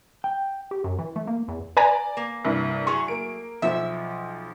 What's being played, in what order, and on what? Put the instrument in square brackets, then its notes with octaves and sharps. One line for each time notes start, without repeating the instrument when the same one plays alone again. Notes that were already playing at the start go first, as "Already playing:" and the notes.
[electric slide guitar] G5
[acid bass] G4
F#2
E3
A3
A#3
E2
[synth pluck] B4 G#5 A#5 [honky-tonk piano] D5
[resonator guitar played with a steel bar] A#3
[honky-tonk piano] C2 G2
[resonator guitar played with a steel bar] F#3 A3 G#4 [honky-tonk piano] C#6
[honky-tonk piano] A#3 D7
[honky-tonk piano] B1 F3 [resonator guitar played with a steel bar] E5